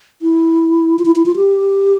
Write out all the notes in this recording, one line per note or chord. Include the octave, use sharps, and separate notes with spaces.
E4
F4
E4
E4
F4
G4